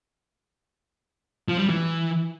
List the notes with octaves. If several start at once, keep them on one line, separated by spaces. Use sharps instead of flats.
F3
G3
E3